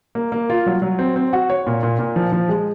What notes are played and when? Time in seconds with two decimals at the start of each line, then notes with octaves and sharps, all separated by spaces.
0.15 A#3
0.32 A#3
0.50 F4
0.66 F#3
0.82 F#3
0.99 C4
1.16 C4
1.33 F#4
1.50 C#5
1.67 A#2
1.83 A#2
1.99 A#2
2.16 F3
2.32 F3
2.49 G#3